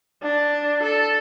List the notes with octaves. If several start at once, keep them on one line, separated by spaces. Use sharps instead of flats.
D4
A4